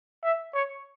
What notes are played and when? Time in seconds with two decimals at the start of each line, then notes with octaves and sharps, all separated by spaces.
0.23 E5
0.54 C#5